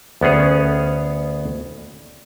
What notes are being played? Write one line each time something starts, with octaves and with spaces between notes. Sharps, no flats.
D2 B3 C#4 G#4 C#5